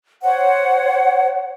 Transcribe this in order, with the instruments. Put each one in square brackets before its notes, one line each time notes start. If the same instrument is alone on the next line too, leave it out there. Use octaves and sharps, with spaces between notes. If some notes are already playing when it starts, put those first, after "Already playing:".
[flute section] C5 C#5 F#5